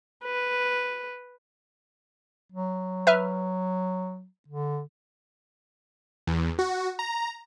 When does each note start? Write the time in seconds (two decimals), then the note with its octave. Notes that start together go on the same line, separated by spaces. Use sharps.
0.24 B4
2.52 F#3
3.07 B4 E5 F6
4.48 D3
6.27 E2
6.59 F#4
6.99 A#5